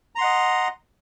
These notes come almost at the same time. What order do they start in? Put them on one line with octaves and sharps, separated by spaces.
A#5 C6 F#5 D#5